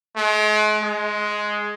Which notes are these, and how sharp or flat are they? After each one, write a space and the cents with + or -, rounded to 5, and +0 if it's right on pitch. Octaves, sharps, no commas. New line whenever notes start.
G#3 +40
G#3 +10